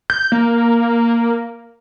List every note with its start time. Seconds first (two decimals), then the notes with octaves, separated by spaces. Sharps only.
0.10 G6
0.32 A#3